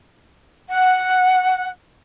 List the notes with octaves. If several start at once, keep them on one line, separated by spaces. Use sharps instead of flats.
F#5